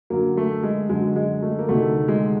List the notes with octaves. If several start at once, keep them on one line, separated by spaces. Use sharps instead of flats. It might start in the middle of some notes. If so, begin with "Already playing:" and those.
F#2 D3 F#3 A#3
A3
G#3
F#2 D3 F#3 G#3
G#3
A3
A#3
D2 C3 D#3 A3
G#3